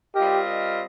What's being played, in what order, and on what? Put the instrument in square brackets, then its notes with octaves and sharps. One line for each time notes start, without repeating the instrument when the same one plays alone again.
[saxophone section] G3 C4 F4 A#4 D#5 [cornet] G4